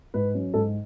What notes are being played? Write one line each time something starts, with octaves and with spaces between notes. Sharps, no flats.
G#2 B4
F#3 C#4
G#2 A4